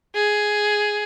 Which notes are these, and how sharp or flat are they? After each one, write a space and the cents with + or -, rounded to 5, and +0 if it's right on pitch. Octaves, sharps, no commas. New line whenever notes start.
G#4 +5